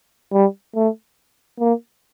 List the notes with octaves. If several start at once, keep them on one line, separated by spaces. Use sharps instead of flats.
G3
A3
A#3